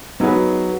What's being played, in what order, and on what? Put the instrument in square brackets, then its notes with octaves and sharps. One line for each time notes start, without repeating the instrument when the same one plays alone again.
[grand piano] F#3 [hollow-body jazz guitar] B3 D#4 G#4 B4